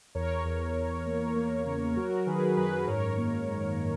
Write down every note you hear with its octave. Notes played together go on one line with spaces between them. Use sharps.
E2 A#4 C#5
E2
E2
A#3
A#3
C#3
F#3 F#4 A#4
D#3 G#4 B4
F#2 G#4 B4
G#2 A#4 C#5
A#3
G#2